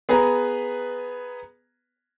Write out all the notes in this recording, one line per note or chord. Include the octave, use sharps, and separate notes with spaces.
B3 G#4 B4 A#5